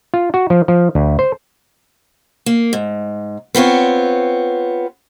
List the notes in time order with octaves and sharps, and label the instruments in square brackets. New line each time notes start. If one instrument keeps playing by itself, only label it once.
[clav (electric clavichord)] F4
F#4
F3
F3
D2
C5
[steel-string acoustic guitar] A#3
G#2
B3 C4 F4 C#5